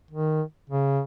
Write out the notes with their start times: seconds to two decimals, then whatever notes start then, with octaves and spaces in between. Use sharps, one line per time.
0.11 D#3
0.70 C#3